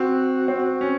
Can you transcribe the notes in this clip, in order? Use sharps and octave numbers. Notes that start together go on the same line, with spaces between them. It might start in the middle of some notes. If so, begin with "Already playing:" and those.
Already playing: C4 F#4
C4
C#4